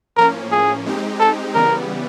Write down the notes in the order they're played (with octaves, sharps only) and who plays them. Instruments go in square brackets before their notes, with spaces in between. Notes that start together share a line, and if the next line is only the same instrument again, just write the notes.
[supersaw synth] A2 F3 A#3 C#4 [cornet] A#4
[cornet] G#4
[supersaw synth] G#3 C4 D#4 G4
[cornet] A4
[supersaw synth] C#3 E3 G3 B3 [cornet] A#4